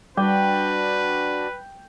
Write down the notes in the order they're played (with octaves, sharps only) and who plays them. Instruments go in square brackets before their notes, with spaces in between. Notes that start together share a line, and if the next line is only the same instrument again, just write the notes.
[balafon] G3 [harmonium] D4 F#4 D5 [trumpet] B4 [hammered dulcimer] G5